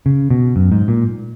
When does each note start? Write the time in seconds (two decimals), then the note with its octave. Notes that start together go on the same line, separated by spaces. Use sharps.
0.06 C#3
0.30 B2
0.56 F#2
0.72 G#2
0.88 A#2